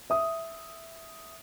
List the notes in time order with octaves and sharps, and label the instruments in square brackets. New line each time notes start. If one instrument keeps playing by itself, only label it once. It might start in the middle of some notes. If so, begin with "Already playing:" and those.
[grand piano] E5 D#6